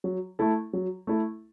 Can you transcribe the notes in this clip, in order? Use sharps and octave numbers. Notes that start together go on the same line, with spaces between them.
F#3
A3 E4 A4
F#3
A3 E4 A4